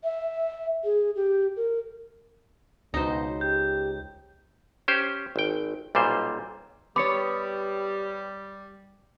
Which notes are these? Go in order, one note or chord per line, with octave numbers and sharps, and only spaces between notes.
E5
G#4
G4
A#4
C#2 B2 D#4 C5
G4 G6
C#4 G4 C5
G#1 G5
B1 A#2 G3 C5
G3 B3 C#5 D6 C#7